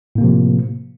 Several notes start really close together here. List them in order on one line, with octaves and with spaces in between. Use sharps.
A2 A#3 C3 F3